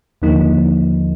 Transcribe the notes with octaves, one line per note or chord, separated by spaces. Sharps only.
D#2 D3 F3 A#3 D#4